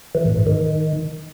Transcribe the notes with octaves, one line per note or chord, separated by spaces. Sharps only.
E3
A2
G#2
D#3